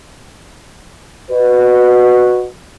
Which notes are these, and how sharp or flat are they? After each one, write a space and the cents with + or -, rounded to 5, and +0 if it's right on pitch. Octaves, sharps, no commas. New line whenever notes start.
F#4 -10 B4 +0 D#5 -40